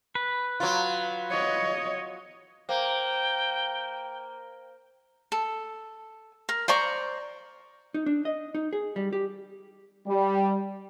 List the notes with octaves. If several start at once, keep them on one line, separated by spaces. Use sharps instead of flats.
B4
F#3 F4
C#5 D#5
A#3 C5 F5 G5 A#5
A4
A#4
C5 D5 A#5 C#6
D#4
D4
D#5
D#4
G#4
G3
G4
G3